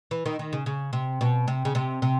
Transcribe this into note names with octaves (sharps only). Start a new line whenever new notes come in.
E3
D#3
D#3
C#3
C#3
C3
B2
C3
C#3
C3
C3